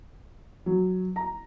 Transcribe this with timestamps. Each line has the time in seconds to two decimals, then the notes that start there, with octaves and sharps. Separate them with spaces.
0.66 F#3
1.16 A#5